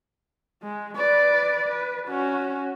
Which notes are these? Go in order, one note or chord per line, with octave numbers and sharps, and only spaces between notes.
G#3
B4 D5
B4
C#4 F#4